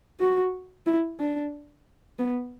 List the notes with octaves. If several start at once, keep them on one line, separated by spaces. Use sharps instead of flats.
F#4
E4
D4
B3